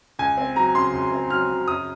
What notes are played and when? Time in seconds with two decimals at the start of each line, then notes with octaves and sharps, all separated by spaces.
0.19 C#2 G#5
0.38 C4
0.56 F#3 A#5
0.75 C#3 C6
0.93 C#2
1.12 C4
1.30 F#3 F6
1.49 C#3
1.67 F#2 D#6